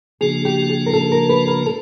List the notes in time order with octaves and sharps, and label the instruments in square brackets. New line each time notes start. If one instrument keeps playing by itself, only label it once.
[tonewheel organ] C#3 F3 A#3 D4 F#4 [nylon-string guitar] G#4
[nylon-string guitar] G4
G#4
A#4
A4
A#4
B4
A#4
A4